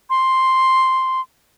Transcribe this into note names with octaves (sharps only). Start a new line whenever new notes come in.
C6